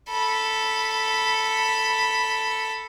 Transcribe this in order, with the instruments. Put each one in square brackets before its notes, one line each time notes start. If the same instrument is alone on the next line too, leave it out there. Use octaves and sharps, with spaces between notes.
[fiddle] A4 B5